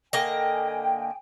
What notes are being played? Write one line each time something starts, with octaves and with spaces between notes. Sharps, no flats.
D3 A#3 D#5 G5 G#5